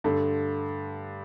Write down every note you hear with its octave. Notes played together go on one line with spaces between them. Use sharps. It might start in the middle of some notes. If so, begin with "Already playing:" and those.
G2 D3 A3